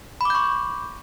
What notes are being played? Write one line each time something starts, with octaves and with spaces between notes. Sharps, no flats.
B5 C#6 D6 G6